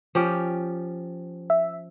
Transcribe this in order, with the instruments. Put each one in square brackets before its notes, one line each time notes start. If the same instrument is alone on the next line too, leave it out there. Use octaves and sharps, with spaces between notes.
[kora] F3 C#4 G4
[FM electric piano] E5